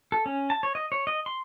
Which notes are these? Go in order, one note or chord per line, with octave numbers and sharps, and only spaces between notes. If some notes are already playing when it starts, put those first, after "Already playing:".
A4
C#4
A5
C#5
D#5
C#5
D#5
C6